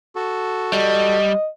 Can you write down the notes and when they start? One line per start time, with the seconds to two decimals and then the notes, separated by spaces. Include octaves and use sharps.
0.15 F#4 A4
0.73 G3 D#5